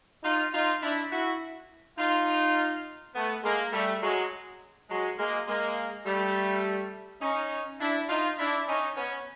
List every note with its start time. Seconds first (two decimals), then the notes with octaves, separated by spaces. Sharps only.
0.24 D#4 F4
0.53 D#4 F4
0.82 D4 E4
1.11 E4 F#4
1.98 D#4 F4
3.14 A3 B3
3.43 G#3 A#3
3.73 G3 A3
4.02 F#3 G#3
4.90 F#3 G#3
5.18 G#3 A#3
5.47 G#3 A#3
6.05 G3 A3
7.22 C#4 D#4
7.80 D4 E4
8.09 D#4 F4
8.38 D4 E4
8.67 C#4 D#4
8.97 B3 C#4